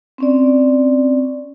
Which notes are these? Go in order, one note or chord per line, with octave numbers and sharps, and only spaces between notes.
C4 C#4 D5